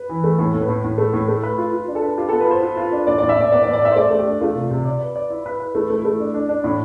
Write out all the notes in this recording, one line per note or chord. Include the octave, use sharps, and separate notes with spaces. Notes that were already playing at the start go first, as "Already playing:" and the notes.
Already playing: B4
E3
A3
A2 A4
A2
B4
A2
A2
A3
A2
A3
B4
F4
F4
D4
A4
B4
F4 G4
A4
B3
B4
F4 C5
F4
F4
D4
A2 D5
D5
A2
E5
A2 D5
B3 D5
D5
A2
D5
B3 E5
C5
A3 D5
A3
G4
D4
A3 F4
C3
C3
D5
B4
D5
E4
B4
B4
A3 E4
A3
E4
A3
D4
D4
D4
A2 E4